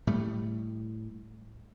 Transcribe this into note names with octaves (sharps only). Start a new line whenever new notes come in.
A2 G3 A3